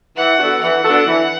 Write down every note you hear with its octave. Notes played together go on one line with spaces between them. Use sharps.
E3 F#5
B3 D4 F#4 A4
E3 F#5
B3 D4 F#4 A4
E3